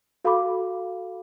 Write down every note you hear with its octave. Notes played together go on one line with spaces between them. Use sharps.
F#4 A4 F5 B5 D6